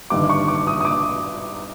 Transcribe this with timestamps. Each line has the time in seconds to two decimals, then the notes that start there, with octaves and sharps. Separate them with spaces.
0.10 G1 G2 D#3 D6
0.30 C#6
0.48 D6
0.67 D#6
0.81 D#6
0.85 D6